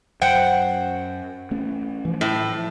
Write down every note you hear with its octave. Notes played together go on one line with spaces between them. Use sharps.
F#2 C5 F#5 G5
A3 C#4
E3 F3
A2